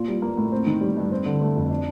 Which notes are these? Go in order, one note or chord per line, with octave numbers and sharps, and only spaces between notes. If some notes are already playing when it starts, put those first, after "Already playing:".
Already playing: A#2 F4
G3
A#3
A2
C4
D#3
G3
G2
C4
D3
A3
F2
D4